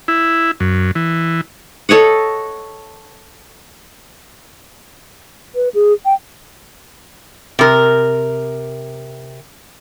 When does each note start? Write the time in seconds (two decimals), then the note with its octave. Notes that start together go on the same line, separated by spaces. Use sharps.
0.08 E4
0.60 F#2
0.95 E3
1.89 A4 C#5 D#5 F#5
5.55 B4
5.74 G#4
6.05 G5
7.59 C3 A#4